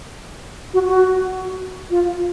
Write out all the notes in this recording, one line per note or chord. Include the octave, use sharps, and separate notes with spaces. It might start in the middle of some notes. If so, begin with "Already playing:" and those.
F#4
F#4
F4